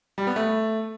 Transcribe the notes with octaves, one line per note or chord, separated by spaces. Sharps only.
G3
B3
A3